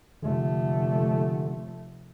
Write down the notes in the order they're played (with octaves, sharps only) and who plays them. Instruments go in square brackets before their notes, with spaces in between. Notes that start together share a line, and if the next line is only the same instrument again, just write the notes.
[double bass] F1 A3 [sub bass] D3